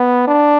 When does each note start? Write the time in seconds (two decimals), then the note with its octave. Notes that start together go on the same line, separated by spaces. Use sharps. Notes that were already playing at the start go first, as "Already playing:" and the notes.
Already playing: B3
0.28 D4